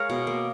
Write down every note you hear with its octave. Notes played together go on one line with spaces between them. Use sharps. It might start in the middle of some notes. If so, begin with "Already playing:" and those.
Already playing: G#3 A#4 C#5 F5
B2
A#3